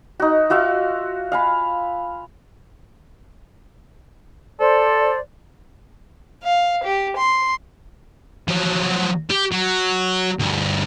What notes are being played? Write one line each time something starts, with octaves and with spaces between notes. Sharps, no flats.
D#4 F#4
F4 F#4 E5 F5
F5 G#5 B5
A4 C5 D5
F5
G4
C6
F3 F#3
G4
F#3
D2 G2